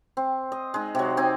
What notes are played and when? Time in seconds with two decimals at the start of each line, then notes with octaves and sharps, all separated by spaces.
0.17 C4
0.52 D#5
0.74 G#3 D#4
0.95 C3 F#3
1.17 C4 D#4 G#5 D6